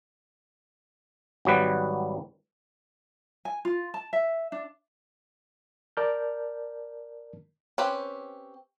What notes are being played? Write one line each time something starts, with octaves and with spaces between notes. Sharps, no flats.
G#1 F#3 G3 B4
G#5
F4
A5
E5
D4
A#4 D5 A5 F6 G6
C4 C#4 G4 B4